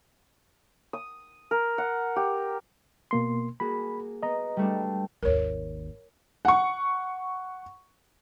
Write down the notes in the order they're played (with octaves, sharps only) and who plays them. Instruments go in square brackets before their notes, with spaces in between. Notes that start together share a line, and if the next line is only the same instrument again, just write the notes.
[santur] D#6
A#4
F#5
G4
[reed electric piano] B2 A#3 C6
[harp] A#3 F#4 G#4 [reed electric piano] B5
[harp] B3 [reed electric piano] D#5 A#5
[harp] G3 A3 D4
[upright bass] G#1 D#2 [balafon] A#4 C#5
[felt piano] F#5 C#6